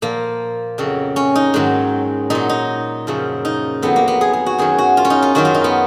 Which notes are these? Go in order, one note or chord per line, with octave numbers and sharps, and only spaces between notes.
A#2 F3 A#3
F2 C#3 F#3
C#4
D#4
G#2 D#3 F#3
A#2 F#3 D#4
D#4
F#2 C#3 F3
D#4
F2 D#3 F#3 B3
A#3
B3
G#4
G#4
F#4
F#2 D#3 F#3 G#4
F#4
F4
C#4
D#4
F4
F#2 D#3 F#3 F#4
F4
D#4
B3